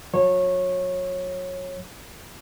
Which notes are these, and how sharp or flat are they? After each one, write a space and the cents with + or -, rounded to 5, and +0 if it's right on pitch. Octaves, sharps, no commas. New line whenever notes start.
F#3 -35 C#5 -20